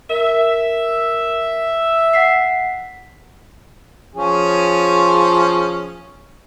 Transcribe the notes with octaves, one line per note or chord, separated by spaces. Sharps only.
A#4 E5
F#5 B6 C7
F3 C#4 G#4